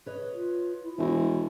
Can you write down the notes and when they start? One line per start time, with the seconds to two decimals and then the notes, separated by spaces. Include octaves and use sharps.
0.06 B4 C#5 D#5
0.34 F4
0.83 E4
0.98 E1 E3 A3